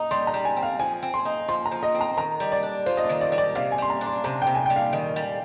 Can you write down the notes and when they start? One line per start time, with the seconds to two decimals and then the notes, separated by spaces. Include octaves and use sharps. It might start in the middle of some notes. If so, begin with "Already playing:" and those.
Already playing: D#4 A#5
0.11 G3 C6
0.27 A#5
0.34 G3
0.45 G#5
0.57 C4
0.63 F5
0.79 F3 G#5
1.03 C4
1.14 C6
1.25 D#4
1.48 F3 C6
1.66 A#5
1.71 F3
1.83 D#5
1.95 C4
2.01 A#5
2.17 D#3 A#5
2.40 G3
2.52 D5
2.63 D4
2.86 F4 C5
2.97 D#5
3.04 D5
3.09 D#3
3.21 D5
3.32 G3
3.38 D5
3.55 C3 F5
3.72 G#5
3.78 G3 C6
3.90 A#5
4.01 D4
4.07 C6
4.24 C3 A#5
4.42 G5
4.47 C3
4.55 G#5
4.66 G3 G5
4.76 F5
4.93 D#3
5.16 G3